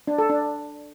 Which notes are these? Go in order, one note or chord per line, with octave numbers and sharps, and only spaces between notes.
D4
A4
D4